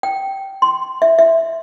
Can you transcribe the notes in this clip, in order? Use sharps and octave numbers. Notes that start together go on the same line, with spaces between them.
G5
C6
E5
E5